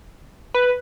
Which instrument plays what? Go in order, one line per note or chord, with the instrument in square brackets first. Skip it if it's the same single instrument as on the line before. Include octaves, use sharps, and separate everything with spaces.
[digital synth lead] B4